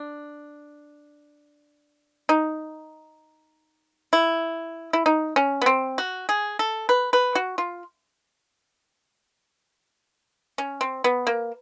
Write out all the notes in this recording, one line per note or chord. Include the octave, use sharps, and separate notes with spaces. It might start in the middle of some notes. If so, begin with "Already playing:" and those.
Already playing: D4
D#4
E4
E4
D#4
C#4
B3
C4
F#4
G#4
A4
B4
B4
F#4
F4
C#4
C4
B3
A#3